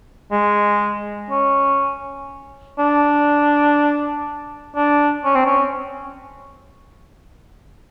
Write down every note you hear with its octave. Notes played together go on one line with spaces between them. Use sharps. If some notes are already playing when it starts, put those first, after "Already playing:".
G#3
C#4
D4
D4
C#4
C4
C#4